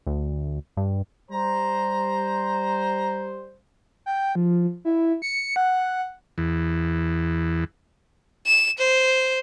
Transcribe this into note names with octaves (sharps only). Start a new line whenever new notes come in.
D2
G2
G3 C5 A#5
G5
F3
E4
C#7
F#5
E2
E7
C5